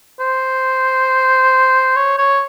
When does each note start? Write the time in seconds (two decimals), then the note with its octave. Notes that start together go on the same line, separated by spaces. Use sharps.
0.20 C5
1.96 C#5
2.18 C#5